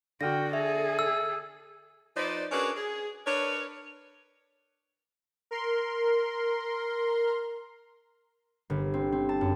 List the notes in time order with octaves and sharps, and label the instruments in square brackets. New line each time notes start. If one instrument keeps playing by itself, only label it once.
[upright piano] D3 F6 [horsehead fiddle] F#4 G5 [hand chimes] A#6
[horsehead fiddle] G#4 A4 [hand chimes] E5
[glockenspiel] E6
[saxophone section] F3 D#4 B4 C5 D5
C#4 D4 F#4 G#4 A#4 B4
G#4
D4 A#4 B4 C#5
[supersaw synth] A#4 C6
[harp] G1
C4
C4
A5
F#2